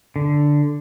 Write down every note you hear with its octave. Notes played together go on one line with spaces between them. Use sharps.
D3